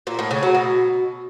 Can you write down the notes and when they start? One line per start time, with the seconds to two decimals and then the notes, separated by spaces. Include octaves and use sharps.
0.07 A#2
0.19 A2
0.31 C#3
0.43 F#3
0.55 B2